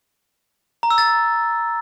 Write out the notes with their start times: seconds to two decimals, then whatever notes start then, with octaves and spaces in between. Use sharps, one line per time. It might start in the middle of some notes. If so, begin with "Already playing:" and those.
0.83 A#5
0.91 E6
0.98 A6